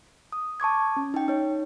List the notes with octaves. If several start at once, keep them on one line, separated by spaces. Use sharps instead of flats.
D#6
A5 C#6 D6 G#6
C#4
D#4 G5
D#4 C#5